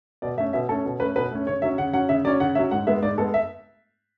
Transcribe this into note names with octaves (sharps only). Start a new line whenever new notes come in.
B2 D5
A3 C#4 E5
B2 E5
A3 C#4 A4
B2
A3 C#4 B4
B2 B4
A3 C#4
C#3 C#5
F#3 C#4 E5
C#3 F#5
F#3 C#4 F#5
C#3 E5
F#3 C#4 D5
C#3 F#5
F#3 C#4 E5
G#2 F#5
G#3 B3 E5
G#2 D5
G#3 B3 A4
E5